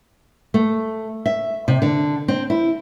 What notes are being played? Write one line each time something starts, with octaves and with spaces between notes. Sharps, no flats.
A3
E5
C3
D3
C4
E4